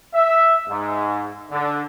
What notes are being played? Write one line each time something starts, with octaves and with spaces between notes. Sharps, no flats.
E5
G#2
D3